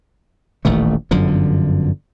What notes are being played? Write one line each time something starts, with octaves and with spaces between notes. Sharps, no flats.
D#1 A1 D#3 A3
G1 F#2 D3 F3